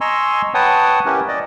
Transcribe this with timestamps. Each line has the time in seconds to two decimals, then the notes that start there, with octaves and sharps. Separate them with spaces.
0.01 D#5 G#5 A#5 C6 C#6 E6
0.54 B4 C#5 F#5 G5 A5 D#6
1.06 C#4 E4 G4 A#4 B4
1.28 D5 D#5